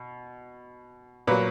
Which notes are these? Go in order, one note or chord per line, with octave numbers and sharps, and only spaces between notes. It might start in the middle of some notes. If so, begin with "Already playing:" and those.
Already playing: B2
A#2 F#3 B4